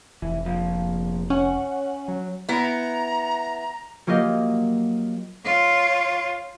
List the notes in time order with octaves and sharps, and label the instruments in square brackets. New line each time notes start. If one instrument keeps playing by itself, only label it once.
[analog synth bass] F1 [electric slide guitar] E3
[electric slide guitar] A#2 F3
[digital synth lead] C#4 [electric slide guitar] F#5
[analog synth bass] F#3
[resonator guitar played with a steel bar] B3 E4 [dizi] A#5
[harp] F#3 A#3 F4 G4 A#4 D#5
[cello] F4 C#5